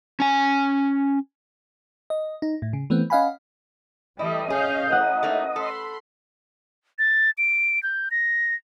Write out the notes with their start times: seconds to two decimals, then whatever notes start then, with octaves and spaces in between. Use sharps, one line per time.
0.20 C#4 G#5
2.10 D#5
2.42 D#4
2.62 A2
2.73 C#3
2.90 E3 A3 B3 C4
3.10 C#4 D#5 F5 F#5 G#5 B5
4.19 E3 G3 A3 E4 D#5
4.50 C#4 G#4 F5 D#6 G6
4.92 A1 F#5
5.23 A3 A#3 D#4
5.56 A4 B5 C6
6.99 A6
7.38 D7
7.83 G6
8.11 A#6